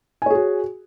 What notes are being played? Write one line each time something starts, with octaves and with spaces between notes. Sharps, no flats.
F#4 G#4 C#5 G#5